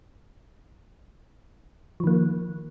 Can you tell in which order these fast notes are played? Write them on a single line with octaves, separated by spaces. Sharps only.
F3 D#3 A#3